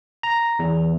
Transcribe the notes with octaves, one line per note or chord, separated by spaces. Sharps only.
A#5
E2